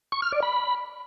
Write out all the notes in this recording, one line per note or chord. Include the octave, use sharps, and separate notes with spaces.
C#6
F6
D5
B5